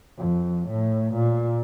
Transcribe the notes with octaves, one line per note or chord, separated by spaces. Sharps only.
F2
A2
A#2